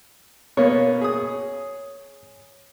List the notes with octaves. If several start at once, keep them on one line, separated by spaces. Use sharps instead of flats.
B2 A#3 B3 C#5
G#4 D#6